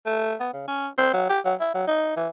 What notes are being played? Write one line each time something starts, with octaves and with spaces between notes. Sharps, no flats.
A3
B3
C#3
C#4
C4
F#3
G4
F#3
E4
F#3
D#4
E3